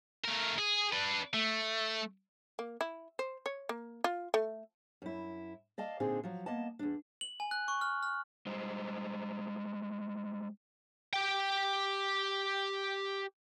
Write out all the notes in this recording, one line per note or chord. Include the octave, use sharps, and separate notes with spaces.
A3 A#4
G#4
D4 B4
A3
A#3
E4
C5
C#5
A#3
F4
A3
F#2 E4
D5 D#5 F5 A5
A#2 D3 C4 D4 D#4 G#4
F3 F#3
A#3 B3 D#5 A5
E2 D4
F#7
G#5
F#6
C#6
F6
F6
G3 G#3 C5 D#5
G4 G5